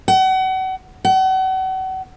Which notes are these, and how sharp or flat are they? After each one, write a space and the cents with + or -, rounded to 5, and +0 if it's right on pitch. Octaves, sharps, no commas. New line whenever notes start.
F#5 +35
F#5 +35